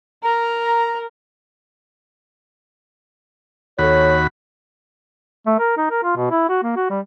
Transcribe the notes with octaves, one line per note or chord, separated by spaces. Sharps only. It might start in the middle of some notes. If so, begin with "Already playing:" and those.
A#4 A#5
D#2 F#4 A4 C#5 B5
A3
A#4
D#4
A#4
F4
B2
E4
F#4
A#3
F#4
G3